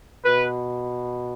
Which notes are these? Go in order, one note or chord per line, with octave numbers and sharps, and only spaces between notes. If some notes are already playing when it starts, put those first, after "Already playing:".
B2 B4